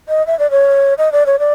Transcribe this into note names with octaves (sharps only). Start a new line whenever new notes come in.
D#5
E5
D5
C#5
D#5
D5
C#5
D5